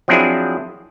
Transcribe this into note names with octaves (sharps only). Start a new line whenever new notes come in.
F3 F#3 C4 D4 E4 G#4